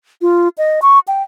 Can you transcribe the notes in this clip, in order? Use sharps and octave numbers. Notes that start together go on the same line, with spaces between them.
F4
D#5
C#6
G5